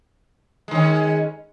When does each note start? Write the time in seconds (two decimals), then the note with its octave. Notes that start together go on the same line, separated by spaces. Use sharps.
0.68 G#3
0.71 D#3
0.75 C#4